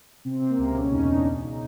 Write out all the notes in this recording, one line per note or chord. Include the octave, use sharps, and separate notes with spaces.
C3 C4
C3
A#3
C#2
B2 C#4
E2 D#4
B2 D4
C#3
D#4